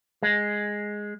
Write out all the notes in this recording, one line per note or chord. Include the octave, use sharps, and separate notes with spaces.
G#3